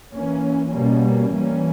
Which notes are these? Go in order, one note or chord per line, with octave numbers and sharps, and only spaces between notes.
E3 A#3 C#4
B2 G3 A#3 C#4
E3 G3 A#3 C#4